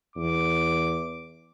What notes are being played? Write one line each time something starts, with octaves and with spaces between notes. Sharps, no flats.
E2 D6